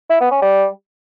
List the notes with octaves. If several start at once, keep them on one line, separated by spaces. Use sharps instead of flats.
E4
B3
C#4
G3